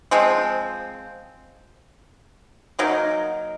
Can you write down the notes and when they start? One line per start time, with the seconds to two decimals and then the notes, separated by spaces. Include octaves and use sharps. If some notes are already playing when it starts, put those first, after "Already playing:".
0.11 F3 G#3 C4
2.79 F#3 A#3 D#4 A#4